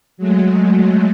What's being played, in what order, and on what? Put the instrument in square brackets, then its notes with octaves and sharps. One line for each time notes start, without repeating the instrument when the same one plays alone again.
[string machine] F#3 G#3 A3